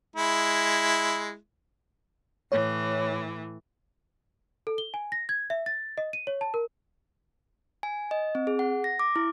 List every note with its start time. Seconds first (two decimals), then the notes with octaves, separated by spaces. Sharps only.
0.16 G#3 E4
2.52 A2 E3 C#5
4.67 A4
4.78 G7
4.94 G#5
5.12 A#6
5.29 G#6
5.50 E5
5.66 A6
5.98 D#5
6.13 D#7
6.27 C#5
6.41 A5
6.54 A#4
7.83 G#5
8.11 D#5
8.35 C4
8.47 G#4
8.59 F#5
8.84 A#6
8.99 D6
9.16 E4